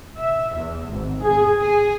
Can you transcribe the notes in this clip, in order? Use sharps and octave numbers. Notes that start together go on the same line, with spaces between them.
E5
E2
G#1
G#4
G#4